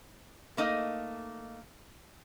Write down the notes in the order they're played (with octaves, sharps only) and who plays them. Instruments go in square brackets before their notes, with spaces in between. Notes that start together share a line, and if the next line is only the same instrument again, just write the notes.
[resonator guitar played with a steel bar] A3 A#3 D#4 D#5